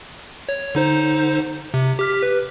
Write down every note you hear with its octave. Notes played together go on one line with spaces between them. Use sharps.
C#5
D3 D#4 C5
C3
G4 F6 B6
B4